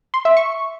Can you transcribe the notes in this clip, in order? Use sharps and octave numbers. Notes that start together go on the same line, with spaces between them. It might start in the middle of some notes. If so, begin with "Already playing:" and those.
C6
E5
C#6